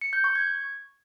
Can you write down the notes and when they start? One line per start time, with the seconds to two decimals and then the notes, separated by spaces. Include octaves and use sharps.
0.01 C#7
0.13 G6
0.24 C#6
0.35 G#6